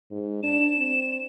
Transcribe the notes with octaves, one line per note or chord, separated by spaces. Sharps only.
G#2
D4 E7
C4